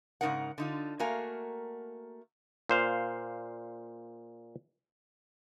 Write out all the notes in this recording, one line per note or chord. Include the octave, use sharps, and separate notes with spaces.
G#2 C#3 F3 D#4 A#4 F#5
D3 D#4 F4
A3 A#3 F#4 A#4 F5 G#5
A#2 C5 F5